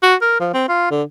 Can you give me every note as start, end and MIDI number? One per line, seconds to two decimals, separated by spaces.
0.03 0.15 66
0.21 0.38 70
0.40 0.49 53
0.54 0.65 60
0.68 0.89 65
0.91 1.02 50